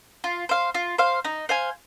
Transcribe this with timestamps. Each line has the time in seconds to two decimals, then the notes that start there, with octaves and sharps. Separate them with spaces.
0.24 F4
0.49 C5 F5
0.74 F4
0.98 C5 F5
1.25 D#4
1.49 C5 F5 G#5